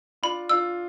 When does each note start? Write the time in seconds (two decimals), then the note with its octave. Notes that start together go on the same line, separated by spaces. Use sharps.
0.23 D4 F4 B5
0.49 D4 F4 E6